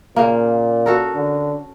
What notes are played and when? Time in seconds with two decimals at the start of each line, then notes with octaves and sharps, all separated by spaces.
0.16 A#2 C#3 A#3
0.86 F#4 A4 A#4
1.15 D3